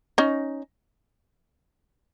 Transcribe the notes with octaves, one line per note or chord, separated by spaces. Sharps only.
C#4 D#4